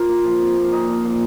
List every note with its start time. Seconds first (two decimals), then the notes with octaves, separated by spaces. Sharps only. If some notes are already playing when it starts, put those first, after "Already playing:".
Already playing: F4 A#4 C5
0.09 A#3
0.25 F3
0.41 C3
0.57 A#3
0.72 A#2 D#4
0.88 F3
1.04 A#2